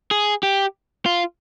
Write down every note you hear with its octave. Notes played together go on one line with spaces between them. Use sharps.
G#4
G4
F4